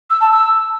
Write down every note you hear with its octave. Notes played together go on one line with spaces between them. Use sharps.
E6
A5
E6